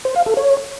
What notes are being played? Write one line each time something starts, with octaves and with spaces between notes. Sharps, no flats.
C5
F5
A4
C#5